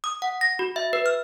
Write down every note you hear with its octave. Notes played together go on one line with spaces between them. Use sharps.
D#6
F#5
A#6
F#4
E5
B4
F6